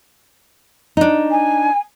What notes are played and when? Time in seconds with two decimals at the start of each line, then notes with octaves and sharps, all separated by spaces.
0.97 D4 D#4
1.30 G#5